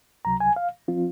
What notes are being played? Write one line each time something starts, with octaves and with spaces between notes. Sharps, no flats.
C#2 C3 F#3 A#5
G#5
F5
F3 C4 F4